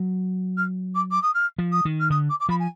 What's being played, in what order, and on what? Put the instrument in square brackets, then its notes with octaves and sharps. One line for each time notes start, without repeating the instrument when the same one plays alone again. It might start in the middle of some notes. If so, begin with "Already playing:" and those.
Already playing: [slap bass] F#3
[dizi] F6
D6
D6
D#6
F6
[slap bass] F3
[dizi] D#6
[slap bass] D#3
[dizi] F6
[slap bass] D3 [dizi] D#6
[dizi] D6
D6
[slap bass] F3 [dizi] B5
[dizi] G#5